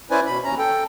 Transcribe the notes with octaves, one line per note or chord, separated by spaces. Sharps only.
C#4 E4 B4 C5 D5 G#5
B2 B5
D#2 C#4 A#5
A4 G5